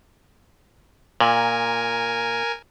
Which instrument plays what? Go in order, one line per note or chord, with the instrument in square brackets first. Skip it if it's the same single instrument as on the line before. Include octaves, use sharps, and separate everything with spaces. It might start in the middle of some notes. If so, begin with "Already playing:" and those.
[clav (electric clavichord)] A#2 [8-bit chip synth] A#4 G#5